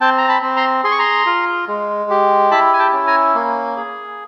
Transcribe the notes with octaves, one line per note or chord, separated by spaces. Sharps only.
C4 G5 A5
A#5
A5 B5
C4
A#5 C6
G#4 C6
C#6
A#5 C6
F4
G#3
G4
E4 A5 B5
G#5
G5 A5
C#4
G#5 A#5
A#3
G#4